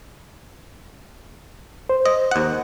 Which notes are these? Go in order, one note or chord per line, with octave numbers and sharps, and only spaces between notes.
C5
D#5
D#2 F#5